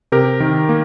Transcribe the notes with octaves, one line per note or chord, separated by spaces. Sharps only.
C3 G4 A#4
D#3
A#3